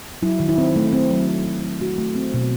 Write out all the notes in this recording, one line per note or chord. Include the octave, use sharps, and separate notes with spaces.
F#3 E4
D#3
E4
C4
A3
C4
F#3
C4
F#3
F#3
A3 F#4
A3
C4
B2